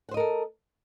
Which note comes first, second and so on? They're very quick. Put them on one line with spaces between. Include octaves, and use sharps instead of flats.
F#5 C5 D#5 A#4 A4